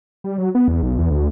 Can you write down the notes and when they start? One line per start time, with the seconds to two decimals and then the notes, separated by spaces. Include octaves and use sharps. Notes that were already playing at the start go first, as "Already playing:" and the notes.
0.24 G3
0.38 F#3
0.55 B3
0.68 E2
0.83 B1
0.99 E2
1.10 D2